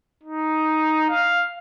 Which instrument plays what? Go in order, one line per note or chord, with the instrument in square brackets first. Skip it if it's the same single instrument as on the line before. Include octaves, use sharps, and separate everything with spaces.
[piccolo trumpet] D#4
F5